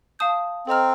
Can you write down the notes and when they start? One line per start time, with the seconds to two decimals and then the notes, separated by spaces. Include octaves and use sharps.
0.19 F5 A5 D#6 G6
0.67 C4 A4 D#5 A#5 F6